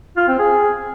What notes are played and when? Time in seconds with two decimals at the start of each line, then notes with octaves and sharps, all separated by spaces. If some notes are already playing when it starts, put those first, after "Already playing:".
0.17 F4
0.28 C4
0.39 G#4